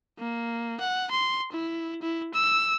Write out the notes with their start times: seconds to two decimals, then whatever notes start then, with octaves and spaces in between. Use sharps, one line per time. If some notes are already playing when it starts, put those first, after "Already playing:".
0.19 A#3
0.80 F#5
1.11 C6
1.52 E4
2.02 E4
2.34 E6